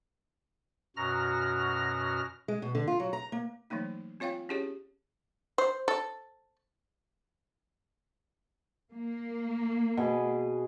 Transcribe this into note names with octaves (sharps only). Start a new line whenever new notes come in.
F#2 B2 F#4 A#5 F6 A#6
G#3
B2
D3
F4
F#3
A#5
A#3
E3 F#3 A3 A#3 D#4
C4 F4 C#5 F5 G5
C#4 E4 G4 G#4 C#5
C5
A4
A#3
B2 G#4